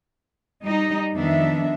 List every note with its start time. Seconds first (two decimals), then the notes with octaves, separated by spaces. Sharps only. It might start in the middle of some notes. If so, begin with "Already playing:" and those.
0.65 G3 D#4 D#5
1.15 F2 D#3 B3 D4 E5